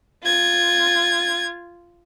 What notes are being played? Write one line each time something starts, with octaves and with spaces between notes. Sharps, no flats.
F4 G#6